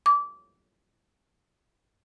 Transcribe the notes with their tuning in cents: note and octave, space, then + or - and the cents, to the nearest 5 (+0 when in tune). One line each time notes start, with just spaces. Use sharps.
D6 -20